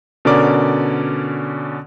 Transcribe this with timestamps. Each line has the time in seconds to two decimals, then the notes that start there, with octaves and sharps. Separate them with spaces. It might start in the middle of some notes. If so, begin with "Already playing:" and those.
0.25 B2 D3 C#4 A#4 D5 D6